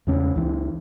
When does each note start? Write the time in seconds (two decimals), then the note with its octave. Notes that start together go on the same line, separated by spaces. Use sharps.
0.07 E2 C#3 G#3 C#4
0.36 C#2 E3